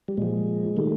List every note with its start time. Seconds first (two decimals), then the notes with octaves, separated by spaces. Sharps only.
0.08 G3
0.17 A#2 F3 G#3
0.77 D#3 G3 A3